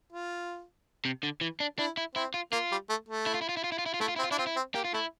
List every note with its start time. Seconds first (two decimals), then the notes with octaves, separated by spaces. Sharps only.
0.12 F4
1.05 C3
1.23 D3
1.41 E3
1.60 D4
1.78 D4 E4
1.97 E4
2.15 C4 E4
2.34 F4
2.52 A#3 F4
2.71 G3
2.89 A3
3.08 A3
3.26 E4
3.34 F4
3.41 E4
3.49 F4
3.57 E4
3.64 F4
3.72 E4
3.79 F4
3.86 E4
3.94 F4
4.00 A3 E4
4.08 F4
4.16 C4 E4
4.24 F4
4.31 D4 E4
4.38 C4 F4
4.47 E4
4.56 C4
4.74 A#3 G4
4.85 F4
4.93 A3 E4